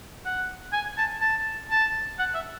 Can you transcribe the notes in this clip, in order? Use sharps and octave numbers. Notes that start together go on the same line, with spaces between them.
F#5
G#5
A5
A5
A5
F#5
E5